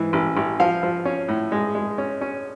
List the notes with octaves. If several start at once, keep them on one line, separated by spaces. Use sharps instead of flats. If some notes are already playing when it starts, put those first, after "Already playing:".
Already playing: G#2 E3
A1
A1
F3 F5
F3
C#4
A2
G#3
G#3
C#4
C#4